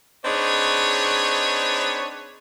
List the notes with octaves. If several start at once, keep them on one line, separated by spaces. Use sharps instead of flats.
C4 D4 D#4 G#4 B4 C#5